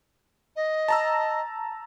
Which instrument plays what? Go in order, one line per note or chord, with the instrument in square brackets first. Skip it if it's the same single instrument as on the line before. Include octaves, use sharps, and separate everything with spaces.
[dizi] D#5
[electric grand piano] A5 A#5 E6